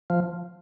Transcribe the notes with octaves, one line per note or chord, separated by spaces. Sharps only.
F3